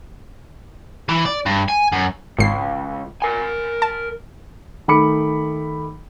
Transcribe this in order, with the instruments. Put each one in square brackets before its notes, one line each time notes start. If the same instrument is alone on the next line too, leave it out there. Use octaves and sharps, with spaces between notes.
[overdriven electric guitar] E3
D5
G2
G#5
F#2
[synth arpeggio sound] G#1 C7 [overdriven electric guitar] C#2
[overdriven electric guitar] A#4 G#5
[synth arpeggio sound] A5
[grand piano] D#3 A3 B5 D6 C#7